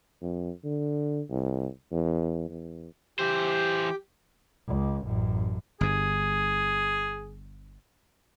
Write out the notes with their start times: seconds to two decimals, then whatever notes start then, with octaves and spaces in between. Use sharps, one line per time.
0.22 F2
0.64 D3
1.30 C2
1.91 E2
2.49 E2
3.19 E3 G4 C5
4.68 C#2
5.04 A1 F#2
5.81 G1 G2 G#4